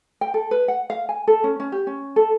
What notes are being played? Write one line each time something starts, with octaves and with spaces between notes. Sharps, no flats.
G5
A4
B4
F#5
F5
G#5
A4
C#4
C#4
G4
C#4
A4